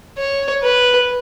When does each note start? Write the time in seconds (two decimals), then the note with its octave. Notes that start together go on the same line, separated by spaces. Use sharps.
0.18 C#5
0.64 B4